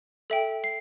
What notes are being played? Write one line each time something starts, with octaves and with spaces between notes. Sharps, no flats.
A4 E5 G5
C7